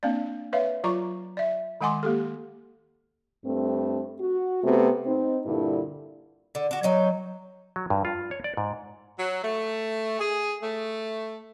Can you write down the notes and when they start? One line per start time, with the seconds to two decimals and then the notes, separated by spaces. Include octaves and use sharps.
0.03 A#3 C4 D4 D5
0.53 B4 C#5 E5 F5
0.84 F#3 F4 D5 A#5 C#6 D6
1.37 D5 E5
1.81 D#3 G#3 F#5 G#5 C6 D6
2.03 A#3 G4 A4
3.45 G2 A3 C4
4.21 F#4
4.64 C3 A3 B3 C4
5.06 C4 D#4
5.46 G2 A#2 D3 E4
6.55 D3
6.71 D4 F#4
6.83 F#3 C#4 D#4 G5
7.76 F#3
7.90 G2
8.05 F4
8.31 C#5
8.44 D5
8.57 G#2
9.18 F#3
9.43 A3
10.19 G#4
10.62 A3